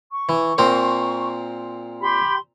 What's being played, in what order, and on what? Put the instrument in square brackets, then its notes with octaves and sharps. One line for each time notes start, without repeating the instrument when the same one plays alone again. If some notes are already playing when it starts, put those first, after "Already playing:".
[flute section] C#6
[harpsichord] E3
A#2 C4 A#4
[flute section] G4 B5 C6